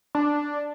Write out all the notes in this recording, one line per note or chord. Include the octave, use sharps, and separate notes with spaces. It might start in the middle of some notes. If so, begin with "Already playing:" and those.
D4